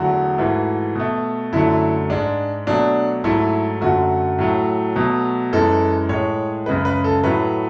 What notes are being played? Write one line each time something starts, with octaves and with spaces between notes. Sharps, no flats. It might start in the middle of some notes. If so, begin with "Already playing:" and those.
Already playing: E2 D3 F#3 A3 F#4
G#2 E3 A3
B2 A3
F#2 D3 F#3 A3 E4
G#2 G#3 D4
B2 F#3 A3 D4
G#2 F#3 A3 E4
F#2 D3 F#3 A3 F#4
A2 F#3 A3
B2 F#3 A3
F#2 E3 G#3 A4
A2 G#3 C#5
F#2 C#3 G#3 B4
B4
A4
A2 F#3 A3 B4